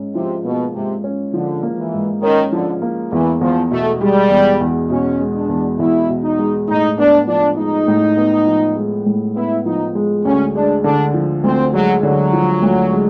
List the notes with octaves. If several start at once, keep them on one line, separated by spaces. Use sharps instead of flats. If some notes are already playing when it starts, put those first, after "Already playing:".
Already playing: G#2 C#4
C3 F3
B2 A#3
G#2 C3
C#4
D3 F3
A#3
E3
G#2
D#3 C#4
D3 F3
A#3
E2 E3
E2 F3
B2 A3
G3 G#3
E2
E2
B2 C#4
G#3
D4
E2
E2 E4
B2
D#4
G#3
A2 D#4
B3 D4
F3 D4
G#3 D#4
A2
B3
F3
G#3
A2
B3 E4
F3 D#4
G#3
D2 C#4
G#3 D4
D3 D4
F3
D2 C4
F#3 G#3
D3 F#3
F3
D2
G#3